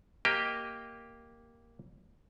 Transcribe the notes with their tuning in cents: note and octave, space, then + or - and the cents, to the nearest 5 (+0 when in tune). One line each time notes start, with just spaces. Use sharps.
A#3 +0 G4 +0 D#5 +0